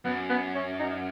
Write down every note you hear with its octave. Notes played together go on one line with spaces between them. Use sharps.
F#2 B3
B3
C#4
D#4